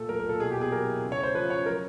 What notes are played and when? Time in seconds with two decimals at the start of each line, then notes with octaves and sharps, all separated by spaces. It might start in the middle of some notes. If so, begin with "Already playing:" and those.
Already playing: A#2 A3 A4
0.09 F#3 A#4
0.20 A#4
0.25 A#2 A4
0.40 B2 G#4
0.51 G4
0.57 B3 G#4
0.72 F#3 A#4
0.87 E4
1.03 C#3
1.12 C#5
1.19 A3 C5
1.34 F3 B4
1.50 C#4 C#5
1.66 F#3 A#4